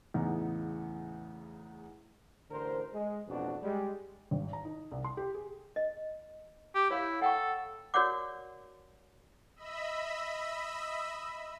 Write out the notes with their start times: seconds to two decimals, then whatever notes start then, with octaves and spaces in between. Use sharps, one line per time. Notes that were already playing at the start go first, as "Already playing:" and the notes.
0.14 E2 A2 C#3 B3 D#4
2.50 A1 D3 A#4 C5
2.92 G#3
3.27 A1 F2 B2 D4 F#4
3.63 G3 G#3
4.31 G#1
4.53 A#5
4.65 D#4
4.92 C2
5.05 C6
5.17 G4
5.34 G#4
5.76 D#5
6.75 G4
6.90 E4 C#5 F5
7.22 A4 F#5 G5 C#6
7.94 F#4 A#4 C#5 D5 F#5 D6
9.56 D#5 E5 B5 E6